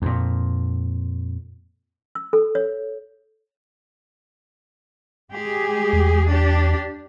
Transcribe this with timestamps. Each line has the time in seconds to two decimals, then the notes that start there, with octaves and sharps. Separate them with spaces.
0.02 F2 A#2
2.15 E6
2.33 A4
2.55 C#5
5.35 G#3 G4 G#4
5.93 E2
6.27 D4 G4